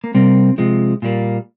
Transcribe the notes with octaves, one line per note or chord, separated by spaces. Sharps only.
A#3
C3 G3 A#3 C4
C3 F3 G#3
A#2 G3 A#3